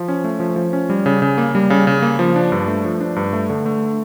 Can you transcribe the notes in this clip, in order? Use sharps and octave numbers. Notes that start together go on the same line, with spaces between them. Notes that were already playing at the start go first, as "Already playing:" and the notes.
Already playing: F3
C#4
A3
F3
F3
C#4
G3
C#3
C#3
A#3
G3
C#3
C#3
A#3
F3
D4
G2
A3
F3
D4
G2
A3
D3
A3